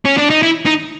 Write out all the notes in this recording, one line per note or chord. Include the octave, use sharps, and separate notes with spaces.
C#4
D4
D#4
E4
D#4